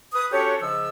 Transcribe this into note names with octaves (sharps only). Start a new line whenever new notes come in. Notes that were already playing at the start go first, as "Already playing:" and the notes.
B4 D#6
C#4 D4 F#4 G4 A4 C#5
G#2 C#3 F3 E6